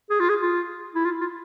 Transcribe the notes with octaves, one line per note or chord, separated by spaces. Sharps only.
G#4
F4
G#4
F4
E4
F4
F4